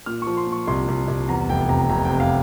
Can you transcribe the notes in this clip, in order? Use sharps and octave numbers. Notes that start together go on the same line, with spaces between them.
A#2 F6
C#6
F3
C6
A#2
C#6
C2 C6
C2
C2
E2 A#5
F1 G5
C3 A#5
F1 A#5
G5
C3
F5